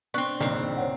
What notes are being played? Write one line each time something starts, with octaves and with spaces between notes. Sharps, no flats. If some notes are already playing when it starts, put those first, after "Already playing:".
B3 C4 D4 C#6 F#6
F#1 A#2 D#3 C4 D4
C5 C#5 F#5